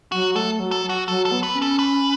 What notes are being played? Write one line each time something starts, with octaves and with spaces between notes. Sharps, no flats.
F#3 F#4
A3 A4
F#3
A4
F#4
F#3 A4
A4
B3
B4
C#4
A4
B4